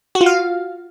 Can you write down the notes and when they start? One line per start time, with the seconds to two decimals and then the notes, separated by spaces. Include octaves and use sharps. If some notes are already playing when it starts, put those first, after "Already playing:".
0.15 F#4
0.21 F4
0.26 F5